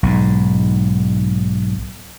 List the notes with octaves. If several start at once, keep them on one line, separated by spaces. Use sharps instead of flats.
B1 G#2